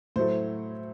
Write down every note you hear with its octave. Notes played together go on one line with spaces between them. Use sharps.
A2 F#3 A3 C5